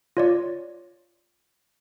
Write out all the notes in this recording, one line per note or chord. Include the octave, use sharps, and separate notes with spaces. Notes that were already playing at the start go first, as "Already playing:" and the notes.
F4 C#5 D5